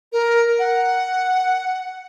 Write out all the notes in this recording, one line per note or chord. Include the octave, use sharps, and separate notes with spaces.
A#4
F#5